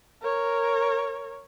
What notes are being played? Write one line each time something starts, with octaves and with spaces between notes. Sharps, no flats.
A#4 C#5